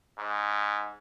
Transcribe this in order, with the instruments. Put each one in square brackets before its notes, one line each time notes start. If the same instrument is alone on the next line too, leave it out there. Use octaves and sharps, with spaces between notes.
[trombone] G#2